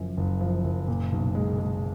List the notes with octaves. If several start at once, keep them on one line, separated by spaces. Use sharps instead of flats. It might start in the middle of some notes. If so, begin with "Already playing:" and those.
Already playing: F#1 F#2 F3
F#1
F3
F#1
A#2
B1
G#3
G#3